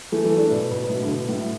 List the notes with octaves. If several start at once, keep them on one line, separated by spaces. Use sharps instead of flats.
E3 A3
E3 A3
A3 D4
B2
B2
B2
A2
D3
B2
A2